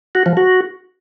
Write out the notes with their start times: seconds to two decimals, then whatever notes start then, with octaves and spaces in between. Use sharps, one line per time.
0.15 F#4
0.26 F3
0.37 F#4